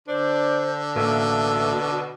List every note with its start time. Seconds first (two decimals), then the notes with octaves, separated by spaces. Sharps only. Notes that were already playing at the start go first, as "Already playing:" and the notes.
0.08 D3 D4 C5
0.95 A1 B2 A#3 A4 E5